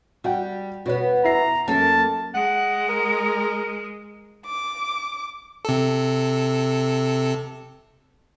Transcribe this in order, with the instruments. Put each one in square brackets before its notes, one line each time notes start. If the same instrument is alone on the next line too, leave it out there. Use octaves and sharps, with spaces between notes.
[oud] G3 [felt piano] F#4 F#5 G5
[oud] B2 B3 [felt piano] F#4 C#5
[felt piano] E4 E5 C7 [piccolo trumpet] A#5
[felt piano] F#2 [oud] A#3 A4 [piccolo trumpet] A5
[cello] G#3 [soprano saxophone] F#5
[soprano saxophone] A#4
[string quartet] D6
[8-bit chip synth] C3 A4